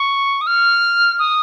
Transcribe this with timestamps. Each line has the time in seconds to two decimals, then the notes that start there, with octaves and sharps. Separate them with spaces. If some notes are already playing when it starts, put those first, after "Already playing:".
Already playing: C#6
0.41 D#6
0.47 F6
1.19 D#6